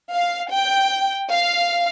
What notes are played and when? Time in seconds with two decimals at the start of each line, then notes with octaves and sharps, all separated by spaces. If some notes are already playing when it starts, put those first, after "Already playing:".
0.13 F5
0.52 G5
1.31 F5